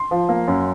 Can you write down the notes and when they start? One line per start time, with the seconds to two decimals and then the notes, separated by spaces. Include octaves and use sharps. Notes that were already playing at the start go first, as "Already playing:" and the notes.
Already playing: C6
0.11 F3
0.29 A#3
0.48 F#2